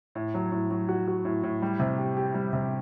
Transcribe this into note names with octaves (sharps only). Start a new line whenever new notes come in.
A2
F#3
A2
F#3
F#4
F#4
A2
A2
G3
C3
G4
G4
G3
C3